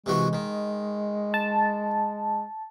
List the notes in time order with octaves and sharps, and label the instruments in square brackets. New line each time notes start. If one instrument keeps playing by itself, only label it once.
[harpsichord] C3 E3 F#4 [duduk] G#3
[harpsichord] D#3
[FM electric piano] A5